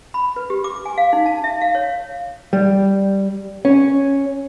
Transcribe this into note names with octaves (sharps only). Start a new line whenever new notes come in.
B5
B4
G4
D6
G#5
F5
D#4
A5
E5
F5
C#5
G3
C#4